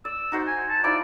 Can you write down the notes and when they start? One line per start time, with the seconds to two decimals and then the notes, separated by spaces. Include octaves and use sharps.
0.05 D5 E6
0.32 D#4 F#4 C5
0.47 G#5
0.69 A5
0.84 F3 D#4 E4 D5